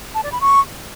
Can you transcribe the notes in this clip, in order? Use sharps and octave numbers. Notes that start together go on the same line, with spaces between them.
A5
D5
B5
C#6